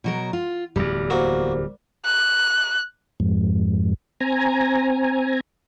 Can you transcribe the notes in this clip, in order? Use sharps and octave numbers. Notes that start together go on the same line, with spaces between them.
B2 F#3 A#4
F4
D1 E2 G3
A#3 F#4 A#4 C5
F#6
F2 G#2
C4 G#5 A#5